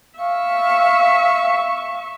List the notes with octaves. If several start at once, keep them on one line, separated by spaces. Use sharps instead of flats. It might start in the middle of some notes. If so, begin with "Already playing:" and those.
E5 F5 C#6